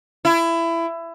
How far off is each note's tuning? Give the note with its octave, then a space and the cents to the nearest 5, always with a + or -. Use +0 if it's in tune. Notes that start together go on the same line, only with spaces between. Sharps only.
E4 +20